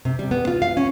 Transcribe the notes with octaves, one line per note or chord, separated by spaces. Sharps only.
C3
G3
B3
F4
F5
C#4